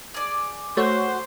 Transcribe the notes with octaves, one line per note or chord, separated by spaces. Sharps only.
G#4 D5
A3 F#4 C5 C#5